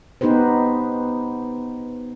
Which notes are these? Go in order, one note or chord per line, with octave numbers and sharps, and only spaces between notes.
B3 D#4 G4 B4 C5